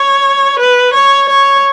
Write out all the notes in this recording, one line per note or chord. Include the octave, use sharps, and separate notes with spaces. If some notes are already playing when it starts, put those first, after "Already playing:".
Already playing: C#5
B4
C#5
C#5